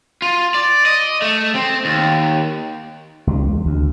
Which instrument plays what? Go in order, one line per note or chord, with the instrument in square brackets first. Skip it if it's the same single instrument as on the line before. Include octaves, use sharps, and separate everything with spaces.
[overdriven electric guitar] F4
D5
D#5
A3
C4
D#2
[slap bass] C#2
E2
D2